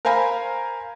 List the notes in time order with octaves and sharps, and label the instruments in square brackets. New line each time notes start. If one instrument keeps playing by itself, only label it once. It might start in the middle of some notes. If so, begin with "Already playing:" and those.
[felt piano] A#4 C5 F5 G#5 A#5 B5